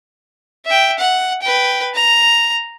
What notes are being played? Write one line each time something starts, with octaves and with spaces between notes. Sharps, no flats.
E5 G5
F#5
B4 G5
A#5